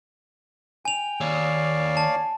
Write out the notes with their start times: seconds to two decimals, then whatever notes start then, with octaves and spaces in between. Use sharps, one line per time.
0.85 G5 G#5 F7
1.21 D#2 C#5 D5 F5
1.97 A5